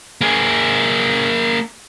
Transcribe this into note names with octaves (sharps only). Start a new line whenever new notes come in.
A#3 G#4